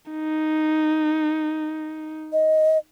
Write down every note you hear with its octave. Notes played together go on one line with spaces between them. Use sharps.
D#4
D#5